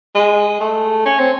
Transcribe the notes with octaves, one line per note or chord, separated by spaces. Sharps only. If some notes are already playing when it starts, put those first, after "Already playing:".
G#3
A3
C#4
C4